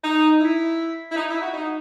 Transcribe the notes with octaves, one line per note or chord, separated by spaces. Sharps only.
D#4
E4
E4
D#4
E4
F#4
D#4